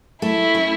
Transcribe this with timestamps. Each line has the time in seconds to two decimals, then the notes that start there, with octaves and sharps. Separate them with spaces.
0.22 A3 E4
0.55 C#4